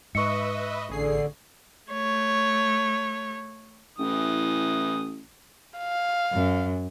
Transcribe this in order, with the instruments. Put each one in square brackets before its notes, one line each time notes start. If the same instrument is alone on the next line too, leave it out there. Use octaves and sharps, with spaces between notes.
[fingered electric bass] G#2 [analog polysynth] B4 D#5 E5 [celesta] C#6 C#7
[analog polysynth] A1 G#4 C7 [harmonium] D3
[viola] A3 C#5
[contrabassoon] A1 [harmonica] E3 D#6
[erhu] F5
[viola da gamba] F#2